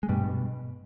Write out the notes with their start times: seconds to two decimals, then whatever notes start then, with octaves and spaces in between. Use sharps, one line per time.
0.03 G#3
0.09 G2 B2 G3
0.24 B2